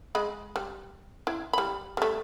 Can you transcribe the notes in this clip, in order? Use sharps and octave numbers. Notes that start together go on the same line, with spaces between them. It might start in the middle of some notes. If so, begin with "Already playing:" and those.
G#3 D#5 B5
G3
E4
G3 B5
G3 A3